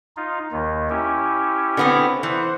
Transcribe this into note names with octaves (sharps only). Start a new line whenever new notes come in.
D#4 F4
D#2 D#3
C#4 E4 G4
D3 B3 C4
E3 C5 F#5